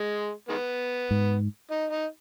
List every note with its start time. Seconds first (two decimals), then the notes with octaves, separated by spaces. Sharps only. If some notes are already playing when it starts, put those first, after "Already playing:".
Already playing: G#3
0.49 D#3 G#3 B3
1.11 G#2
1.71 D#4
1.91 D#4